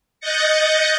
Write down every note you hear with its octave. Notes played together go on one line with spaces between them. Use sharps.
D#5 F#6 G6 A6 A#6 C#7